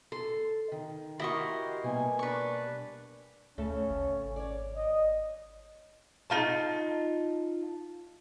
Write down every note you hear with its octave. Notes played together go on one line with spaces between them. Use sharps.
A4 C6
D#3
E4 F#4 G4 A#4 D#5 C6 C#6
B2 G3 A#3 G#5
D4 B4 C#6
D2 C#3 A3 C#4 A4
G#1
C#5 D5
D#5
D#4 F4 A5